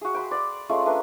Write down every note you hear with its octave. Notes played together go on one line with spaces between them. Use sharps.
F#4 G#4
G5 B5 C6
D5 F#5
G#3 A3 C#4 F4
A3 D4 A#4 B4